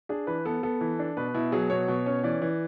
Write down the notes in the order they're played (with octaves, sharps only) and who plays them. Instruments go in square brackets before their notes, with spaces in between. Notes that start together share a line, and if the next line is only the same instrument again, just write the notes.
[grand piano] D4 G#4
E3 B4
B3 A4
B3 A4
E3
D4
B2 B4
B2 E4
F#3 G#4
B2 C#5
B2
C#4
E3 D5
E3